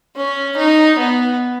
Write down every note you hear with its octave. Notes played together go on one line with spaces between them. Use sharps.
C#4
D#4
B3